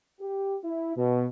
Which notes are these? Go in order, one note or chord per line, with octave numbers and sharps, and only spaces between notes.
G4
E4
B2